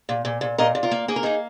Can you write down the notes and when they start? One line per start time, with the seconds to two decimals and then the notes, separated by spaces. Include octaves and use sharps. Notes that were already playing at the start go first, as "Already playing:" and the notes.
0.09 A#2
0.25 A#2
0.41 A#2
0.58 A#2 A#4 D#5
0.75 A#2
0.83 F4 A#4
0.91 A#3
1.08 A#3 G#4
1.16 A#4
1.23 A#3 D#4 G#4